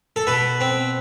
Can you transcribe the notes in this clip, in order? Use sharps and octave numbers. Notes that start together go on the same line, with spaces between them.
A4
B2 B4
C4